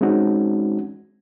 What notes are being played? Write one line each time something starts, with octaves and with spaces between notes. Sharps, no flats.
G#3 C4 C#4 D#4 F#4